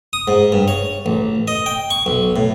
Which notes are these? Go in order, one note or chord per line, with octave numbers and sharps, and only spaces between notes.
D#6
G#2
G2
C#5
A1
D#5
G5
C#6
B1
A2